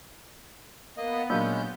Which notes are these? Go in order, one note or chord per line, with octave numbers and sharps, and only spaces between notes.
A#3 B3 D#5
A#2 F#3 G#3 A#3 C#4 D4 G6